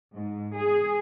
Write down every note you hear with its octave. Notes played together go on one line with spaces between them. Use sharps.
G#2
G#4